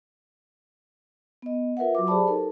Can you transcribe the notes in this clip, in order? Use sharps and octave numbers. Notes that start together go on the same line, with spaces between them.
B3 D#5
F4 A#4 B4 E5 F#5
F#3 F#4 D6
G4 G#4 C5 D5 A5 B5
D#4 A4 A#4